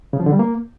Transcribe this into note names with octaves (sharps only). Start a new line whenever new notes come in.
C#3
F3
D3
G3
A#3